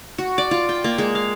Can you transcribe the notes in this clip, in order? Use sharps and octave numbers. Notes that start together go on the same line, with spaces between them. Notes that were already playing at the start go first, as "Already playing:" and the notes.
F#4
D5
F4
G5
A#3
G#3
F5